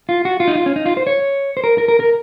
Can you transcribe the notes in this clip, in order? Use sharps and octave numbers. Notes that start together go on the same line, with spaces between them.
F4
F#4
F4
D#4
F4
C#4
D#4
F4
C5
C#5
C5
A#4
A#4
A#4
A#4